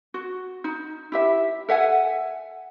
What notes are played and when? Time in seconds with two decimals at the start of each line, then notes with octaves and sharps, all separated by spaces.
0.14 F#4
0.64 D#4
1.12 E4 G4 E5
1.69 A4 E5 F#5 G#5